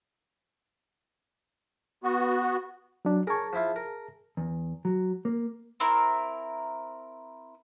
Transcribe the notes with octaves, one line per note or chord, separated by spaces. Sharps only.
B3 F#4
F#3 D4
G#4 A#4 C#5 A5
F3 E4 F4
A#4
E2
F#3
A#3
C4 E4 A#4